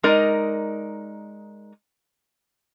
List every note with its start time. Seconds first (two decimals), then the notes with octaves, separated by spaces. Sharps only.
0.03 G#3 D#4 A#4 D5